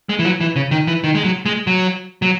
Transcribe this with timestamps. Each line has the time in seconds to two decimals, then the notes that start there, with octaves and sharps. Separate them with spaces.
0.09 G#3
0.19 E3
0.25 F#3
0.40 E3
0.56 C#3
0.71 D#3
0.87 E3
1.04 D#3
1.15 G#3
1.24 F#3
1.46 G#3
1.67 F#3
2.22 F#3